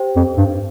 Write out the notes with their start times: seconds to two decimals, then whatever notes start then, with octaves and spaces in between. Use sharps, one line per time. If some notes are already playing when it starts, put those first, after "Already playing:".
Already playing: G4 C5 G5
0.16 F2
0.37 G2